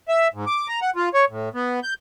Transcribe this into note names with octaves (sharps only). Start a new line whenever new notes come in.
E5
G#2
D6
A#5
F#5
F4
C#5
A2
B3
G6